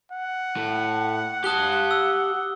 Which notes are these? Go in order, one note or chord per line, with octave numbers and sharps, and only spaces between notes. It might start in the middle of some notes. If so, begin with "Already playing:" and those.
F#5
A2
G4 A5 D#6 F#6 G7
E6